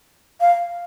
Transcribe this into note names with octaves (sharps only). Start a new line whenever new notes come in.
F5